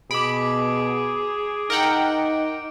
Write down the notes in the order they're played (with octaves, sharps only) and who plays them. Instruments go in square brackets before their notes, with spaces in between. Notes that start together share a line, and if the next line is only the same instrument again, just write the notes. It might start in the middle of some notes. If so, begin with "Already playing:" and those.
[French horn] B2 [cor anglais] G#4 [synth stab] B5 [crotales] D6 D7
[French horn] D#4 [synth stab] A#4 F#5 G5 [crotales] D7